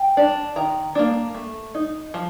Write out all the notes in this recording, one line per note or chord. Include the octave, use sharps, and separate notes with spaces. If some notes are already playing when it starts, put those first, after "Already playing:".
Already playing: G5
D4
D#3 A#5
A#3 D4
A3
D#4
F3